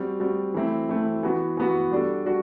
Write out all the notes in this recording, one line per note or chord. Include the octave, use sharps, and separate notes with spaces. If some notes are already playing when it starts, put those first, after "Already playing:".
Already playing: G3 C4 F#4
G3 C4 F#4
E3 A3 C4 E4
E3 A3 C4 E4
E3 B3 F#4
E3 B3 F#4
G3 D4 F#4 A4
G3 D4 F#4